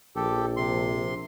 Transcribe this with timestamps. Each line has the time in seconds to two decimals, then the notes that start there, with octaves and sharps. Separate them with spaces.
0.16 A#1 G4 A4
0.57 C3 C6